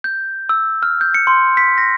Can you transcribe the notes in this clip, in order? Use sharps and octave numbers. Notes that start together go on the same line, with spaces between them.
G6
E6
F6
G6
C#7
C6
B6
A#6